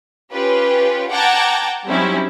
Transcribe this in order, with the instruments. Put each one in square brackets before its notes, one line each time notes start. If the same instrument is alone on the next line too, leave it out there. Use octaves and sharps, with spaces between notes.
[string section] C#4 F4 G4 B4
F#5 G5 A5 A#5 D6 G#6
F#3 G3 C4 C#4 D#4 E4